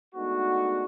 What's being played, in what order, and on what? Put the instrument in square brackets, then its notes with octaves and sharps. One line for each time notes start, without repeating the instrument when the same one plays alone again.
[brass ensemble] G#3 A3 B3 D4 D#4 F#4